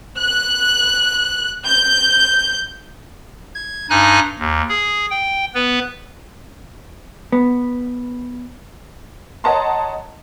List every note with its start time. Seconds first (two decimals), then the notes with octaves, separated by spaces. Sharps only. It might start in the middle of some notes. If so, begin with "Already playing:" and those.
0.17 F#6
1.66 G6
3.55 G#6
3.90 G2 D#4 G#5 F#6
4.39 D#2
4.68 G#4
5.10 G5
5.54 B3 B4
7.32 B3
9.44 C#5 D#5 F#5 A5 A#5 C6